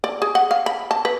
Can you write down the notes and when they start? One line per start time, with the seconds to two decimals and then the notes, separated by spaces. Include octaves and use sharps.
0.04 D5
0.22 G#4
0.35 F#5
0.51 F5
0.66 B5
0.91 A5
1.05 B4